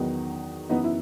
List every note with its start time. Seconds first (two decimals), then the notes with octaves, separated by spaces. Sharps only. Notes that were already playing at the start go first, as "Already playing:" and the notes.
Already playing: E2 D#3 F#3 B3 D#4
0.69 F#2 E3 B3 D#4
0.84 E4